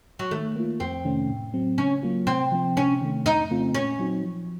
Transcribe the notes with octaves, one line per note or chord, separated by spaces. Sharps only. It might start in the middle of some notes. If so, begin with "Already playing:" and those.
F#3
D#3 A3
A#3 F4
F2 C4
C3 D#3 A3 C#4
A2
F#3 C4
C#3 C#4
F#3 A#3 F4
C3 C4
F3 C4
C3 C#4
D#3 A3
F2 D#4
C#3 A3 C4 F4
A#2 C#4
F#3 C4 D#4 F#4
F3